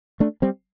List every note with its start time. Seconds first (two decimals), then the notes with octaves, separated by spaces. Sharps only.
0.20 A3 D4
0.42 G3 C4